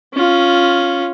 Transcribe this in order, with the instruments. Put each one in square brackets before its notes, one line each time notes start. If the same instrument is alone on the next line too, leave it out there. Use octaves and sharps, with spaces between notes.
[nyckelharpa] C#4 F4